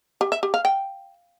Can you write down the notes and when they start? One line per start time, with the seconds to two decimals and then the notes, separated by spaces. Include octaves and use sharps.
0.21 G4
0.32 E5
0.43 G4
0.54 F5
0.65 G5